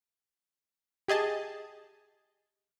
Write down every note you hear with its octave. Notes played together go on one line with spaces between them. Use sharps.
G4 G#4 D#5 A5